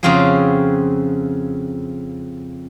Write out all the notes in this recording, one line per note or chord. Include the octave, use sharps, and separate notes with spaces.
F2 C#3 C4 F4 F#4 G#4